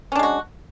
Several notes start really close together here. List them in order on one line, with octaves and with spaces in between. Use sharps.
C#4 D4 G#3 F#4